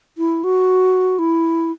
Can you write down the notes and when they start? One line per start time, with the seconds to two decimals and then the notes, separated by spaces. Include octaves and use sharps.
0.18 E4
0.44 F#4
1.19 E4